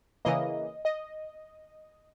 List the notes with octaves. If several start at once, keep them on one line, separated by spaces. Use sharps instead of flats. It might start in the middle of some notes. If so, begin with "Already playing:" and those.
C#3 E3 A#3 D#5
D#5